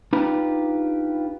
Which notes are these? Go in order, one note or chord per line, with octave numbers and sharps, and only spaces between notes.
D4 D#4 F4 G4 B4 B5